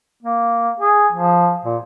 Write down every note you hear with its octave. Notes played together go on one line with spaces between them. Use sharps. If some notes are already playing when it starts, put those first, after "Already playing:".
A#3
G#4
F3
A#2